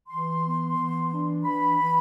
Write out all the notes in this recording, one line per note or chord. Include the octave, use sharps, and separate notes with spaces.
E3 C6
B3
E3
D4
E3 B5
E3